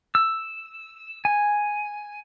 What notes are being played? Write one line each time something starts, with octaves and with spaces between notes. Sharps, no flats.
E6
G#5